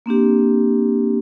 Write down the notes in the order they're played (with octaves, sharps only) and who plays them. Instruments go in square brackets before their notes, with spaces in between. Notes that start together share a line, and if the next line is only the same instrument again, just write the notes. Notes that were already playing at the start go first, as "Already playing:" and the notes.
[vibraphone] A#3 C4 D4 G4